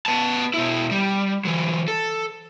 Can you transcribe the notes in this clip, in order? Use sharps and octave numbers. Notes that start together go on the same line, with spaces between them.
B3 A5
B2 E4
G3
E3 F#3
A4